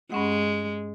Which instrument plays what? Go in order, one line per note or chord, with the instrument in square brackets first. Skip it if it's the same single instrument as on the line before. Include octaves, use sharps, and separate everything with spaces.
[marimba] G2 C#4 F#5 [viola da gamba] G#3